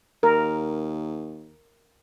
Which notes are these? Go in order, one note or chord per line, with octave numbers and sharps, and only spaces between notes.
D#2 A#4